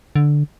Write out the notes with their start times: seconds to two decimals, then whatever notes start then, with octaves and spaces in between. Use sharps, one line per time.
0.16 D3